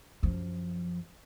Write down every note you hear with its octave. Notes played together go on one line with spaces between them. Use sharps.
F#2 F3